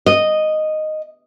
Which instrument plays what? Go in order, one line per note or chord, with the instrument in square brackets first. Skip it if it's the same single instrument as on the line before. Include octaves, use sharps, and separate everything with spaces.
[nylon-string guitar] D#5